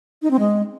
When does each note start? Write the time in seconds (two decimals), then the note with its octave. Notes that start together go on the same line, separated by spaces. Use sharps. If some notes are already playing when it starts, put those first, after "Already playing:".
0.22 D#4
0.31 C4
0.39 G#3